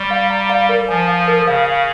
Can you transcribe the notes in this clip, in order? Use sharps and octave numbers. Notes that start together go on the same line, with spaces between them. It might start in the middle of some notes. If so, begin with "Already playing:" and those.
Already playing: G3 C#6
F5
A#5
F5
A#4
F3 G#5
F5
A#4
C#3 F5
F5